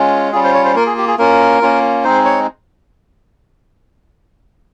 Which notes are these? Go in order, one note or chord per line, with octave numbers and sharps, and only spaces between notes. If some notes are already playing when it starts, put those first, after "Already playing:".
Already playing: G#3 C#4 F4
G3 C#4 F4 G#4
C5
C#5
C5
A#3 F4 A#4
G#4
G4
G#4
A#3 C#4 F4 A#4
A#3 C#4 F4
G#3 C4 D#4 C5
C#5